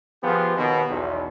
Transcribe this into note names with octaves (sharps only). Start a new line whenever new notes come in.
F3 B3 F4 G4 G#4
D#2 B2
B1 E2